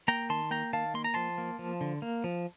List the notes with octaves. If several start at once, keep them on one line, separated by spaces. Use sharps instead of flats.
A#3 G5 A#5
D#3 A5 C6
A#3 G5 A#5
D#3 F5 A5
A#3 C6
A#5
F3 A5 C6
A#3
F3
D3
A#3
F3